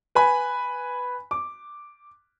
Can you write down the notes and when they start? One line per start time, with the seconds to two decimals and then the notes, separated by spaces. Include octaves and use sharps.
0.15 B4 G#5 B5
1.31 D6